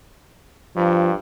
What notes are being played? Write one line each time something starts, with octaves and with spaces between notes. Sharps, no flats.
G2 F3